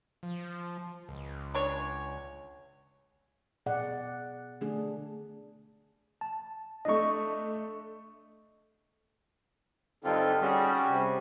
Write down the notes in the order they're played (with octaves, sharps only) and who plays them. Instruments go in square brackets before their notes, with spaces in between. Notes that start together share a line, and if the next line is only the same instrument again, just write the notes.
[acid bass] F3
C#2
[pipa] D4 C#5
[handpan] B2 G#4 D5 F#5
D3 A3 D4 G#4
[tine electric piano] A5
[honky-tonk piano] A3 D4 [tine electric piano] D#5 C#6
[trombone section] G2 D3 [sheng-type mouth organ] C4 F4 [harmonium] D#4 A4
[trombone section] G3 [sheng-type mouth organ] C#4 F#4 [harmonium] G#4
[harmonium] C3